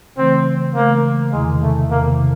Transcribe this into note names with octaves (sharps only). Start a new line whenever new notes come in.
C#3 E3 A3 C4
C#3 E3 A3 A#3
E2 C3 D#3 G#3
A3
E2 C3 D#3 A#3